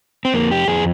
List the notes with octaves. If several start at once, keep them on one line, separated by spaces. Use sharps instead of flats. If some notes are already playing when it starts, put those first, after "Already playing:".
C4
F2 A#3
G4
F2 G#4